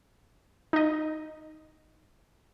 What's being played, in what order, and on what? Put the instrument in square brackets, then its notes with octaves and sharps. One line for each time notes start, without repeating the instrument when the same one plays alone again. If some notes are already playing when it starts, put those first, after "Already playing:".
[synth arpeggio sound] D#4 D#5